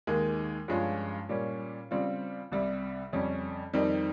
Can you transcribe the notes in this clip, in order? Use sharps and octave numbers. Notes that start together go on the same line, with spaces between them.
D#2 D#3 G#3
G2 F3 G#3 C#4 F4
A#2 G3 C#4
C#3 G3 C4 F4
C2 C3 G3
F2 C#3 G3 C#4
F2 D#3 G3 C4 D#4